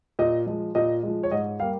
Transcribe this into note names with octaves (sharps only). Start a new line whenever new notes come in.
A#2 D#5
F3 G#3
A#2 D#5
F3 G#3
C#5
G#2 D#5
G3 A#3 F5